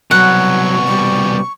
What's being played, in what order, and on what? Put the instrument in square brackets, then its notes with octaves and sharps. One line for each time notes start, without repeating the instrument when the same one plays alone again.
[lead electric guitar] C2 B2 [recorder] F#3 [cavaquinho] F#5 [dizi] C#6
[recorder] G3